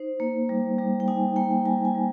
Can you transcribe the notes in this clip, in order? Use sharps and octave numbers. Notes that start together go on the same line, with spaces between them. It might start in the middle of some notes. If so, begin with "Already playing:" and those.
Already playing: D#4 C5
A#3
G3
G3
G5
D#4 G#5
A#3 G5
G3 G#5
G#5
G3